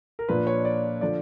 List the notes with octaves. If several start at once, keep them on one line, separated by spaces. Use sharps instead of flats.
A#4
A#2 F3 A#3 D4 B4
C#5
D5
D3 F3 D5